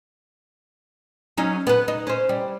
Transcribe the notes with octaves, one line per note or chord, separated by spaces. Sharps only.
F#3 C#4 D#4
B3 B4
D#4
C#4 C5
G3